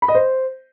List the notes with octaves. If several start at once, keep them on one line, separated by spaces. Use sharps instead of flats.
B5
D#5
C5